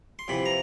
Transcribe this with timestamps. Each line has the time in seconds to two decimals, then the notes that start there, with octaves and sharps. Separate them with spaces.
0.19 C6
0.28 F2 C3 E3 B5
0.46 A#5